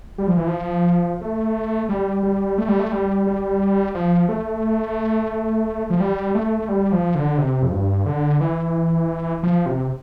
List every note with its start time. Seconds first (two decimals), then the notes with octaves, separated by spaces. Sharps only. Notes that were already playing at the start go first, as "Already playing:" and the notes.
0.18 G3
0.27 F3
0.37 E3
0.47 F3
1.21 A3
1.89 G3
2.23 G3
2.58 A3
2.68 G3
2.80 A3
2.92 G3
3.27 G3
3.95 F3
4.29 A3
5.90 F3
6.00 G3
6.35 A3
6.59 A3
6.69 G3
6.92 F3
7.15 D3
7.38 C3
7.63 F2
7.72 G2
8.06 D3
8.41 E3
9.43 F3
9.66 C3